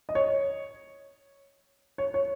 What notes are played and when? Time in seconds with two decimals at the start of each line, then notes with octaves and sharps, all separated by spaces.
0.09 D#5
0.15 C#5
1.98 C#5
2.14 C#5